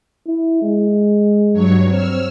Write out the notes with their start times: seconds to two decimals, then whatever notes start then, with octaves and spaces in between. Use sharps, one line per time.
0.27 E4
0.62 G#3
1.53 G2 F#3 C#5
1.90 C4 E6 F6